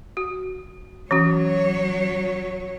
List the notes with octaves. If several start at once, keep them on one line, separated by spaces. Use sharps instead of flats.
F#4
E3 F#3 C#4 F#4 C#5